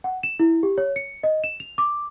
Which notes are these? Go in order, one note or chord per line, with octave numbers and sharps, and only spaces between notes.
F#5
E7
E4
G4
C#5
C#7
D#5
E7
F7
D6